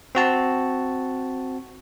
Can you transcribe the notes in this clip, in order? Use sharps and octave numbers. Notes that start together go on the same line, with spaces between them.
C4 F#4 A5